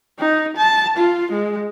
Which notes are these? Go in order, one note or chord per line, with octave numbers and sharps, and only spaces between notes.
D#4
A5
F4
G#3